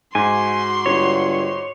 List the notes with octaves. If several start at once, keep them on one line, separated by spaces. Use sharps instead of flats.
G#2 F#4 G#5 C6
G1 C#5